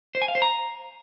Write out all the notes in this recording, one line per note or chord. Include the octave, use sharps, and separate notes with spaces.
C5
G#5
F5
C5
A#5